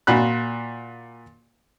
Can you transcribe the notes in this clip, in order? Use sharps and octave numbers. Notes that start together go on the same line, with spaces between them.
A#2 F#4 B5 F#6